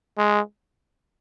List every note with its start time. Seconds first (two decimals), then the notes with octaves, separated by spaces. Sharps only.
0.18 G#3